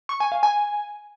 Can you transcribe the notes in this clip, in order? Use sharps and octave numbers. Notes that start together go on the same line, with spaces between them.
C#6
G#5
F5
G#5